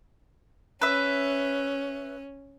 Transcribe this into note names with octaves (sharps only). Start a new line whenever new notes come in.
C#4 B4 E5